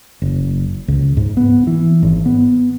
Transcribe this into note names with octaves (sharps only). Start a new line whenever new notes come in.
F#1
C#2
G#2
B3
E3
G#1
B3